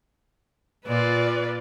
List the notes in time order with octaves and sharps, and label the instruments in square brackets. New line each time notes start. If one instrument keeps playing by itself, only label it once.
[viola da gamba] A#2 F4 [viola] B4 D5